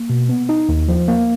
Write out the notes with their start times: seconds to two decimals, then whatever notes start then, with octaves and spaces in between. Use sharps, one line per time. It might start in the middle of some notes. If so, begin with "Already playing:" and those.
Already playing: A#3
0.10 B2
0.29 B3
0.49 D#4
0.69 D#2
0.88 F3
1.08 A#3